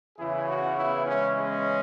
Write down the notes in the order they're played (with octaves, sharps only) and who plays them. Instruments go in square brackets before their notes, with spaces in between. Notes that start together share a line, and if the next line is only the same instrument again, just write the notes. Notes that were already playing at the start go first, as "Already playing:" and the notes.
[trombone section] E2 C#3 E3 E4 G#4
C#4 F#4
B3 E4
G#3 C#4
G#3 C#4